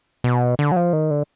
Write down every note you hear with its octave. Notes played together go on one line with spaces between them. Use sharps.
B2
D3
F#3
F3
D#3
D3